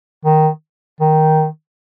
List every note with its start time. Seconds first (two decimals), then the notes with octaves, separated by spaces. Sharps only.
0.25 D#3
1.01 D#3